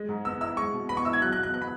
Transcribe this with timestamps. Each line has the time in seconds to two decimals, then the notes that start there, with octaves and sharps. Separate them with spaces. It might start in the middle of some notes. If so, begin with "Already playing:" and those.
Already playing: G#3
0.09 G#2
0.25 B3 E6
0.41 E4 E6
0.57 G#3 C#6
0.73 B2
0.89 B3 B5
0.97 C#6
1.05 E4 E6
1.13 G#6
1.21 F#3 F#6
1.33 F#6
1.37 B2
1.43 F#6
1.54 B3 F#6
1.61 B5